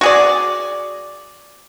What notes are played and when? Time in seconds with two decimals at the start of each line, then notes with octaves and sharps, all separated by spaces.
0.01 F#4 G#4 D5